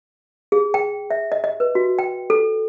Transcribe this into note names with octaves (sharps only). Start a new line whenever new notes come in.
G#4
G5
E5
D#5
D#5
B4
F#4
G5
A4